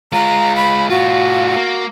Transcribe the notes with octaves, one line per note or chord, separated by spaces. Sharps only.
G#3 F4 A#5
B5
A2 F4 F#4
A#3